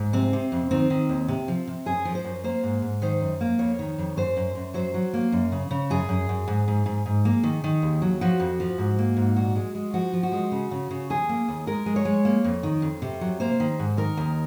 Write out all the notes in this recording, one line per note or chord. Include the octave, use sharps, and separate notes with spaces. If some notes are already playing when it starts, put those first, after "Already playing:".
Already playing: G#2
C3 C4
C3
F2
D#3 C4
D#3
D#2
C3
F3
C3
F#2 G#4
F3
C5
F#2
A#3 C5
G#2
G#2
D#3 C5
F#2
A#3
F2 C#5
D#3
F2
F#2 C5
F#2
F#2
F#3 C5
F#3
A#3
F#2
C#3
C#3
F#2 G#4
F#2
F#2
G#2
G#2
G#2
G#2
A#3
D#3
D#3
D#2
F#3
F3 F#4
F2
F3
G#2
A#3
G#2
A#2 F#4
G#3
G#3
F3 F#4
F3
F#4
G#3
C#3
C#3
C#3
D#2 G#4
A#3
D#2
G#3 A#4
G#3
C#5
G#3
A#3
F2
D#3
F2
C3
F#3
A#3 C5
D#3
G#2
D#3 A#4
D#2